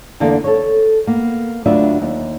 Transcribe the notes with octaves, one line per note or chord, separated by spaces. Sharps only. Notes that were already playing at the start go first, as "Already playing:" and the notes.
E2 D3 E3 A#3 B3 D4
A4 C#5
A#3 B3
D2 F#3 D4 F4 B4 E5
D#2